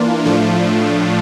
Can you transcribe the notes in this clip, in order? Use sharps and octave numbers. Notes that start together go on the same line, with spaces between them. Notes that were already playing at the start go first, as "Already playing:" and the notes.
Already playing: E3 A#3 D4 F4
A2 F3 A3 D4 F4